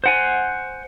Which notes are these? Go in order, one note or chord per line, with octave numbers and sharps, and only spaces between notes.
C5 F#5 G#5